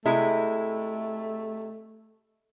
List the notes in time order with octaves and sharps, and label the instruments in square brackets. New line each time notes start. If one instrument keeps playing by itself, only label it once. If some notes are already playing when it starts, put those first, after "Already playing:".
[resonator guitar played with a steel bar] C3 G#3 E4 [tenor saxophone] A3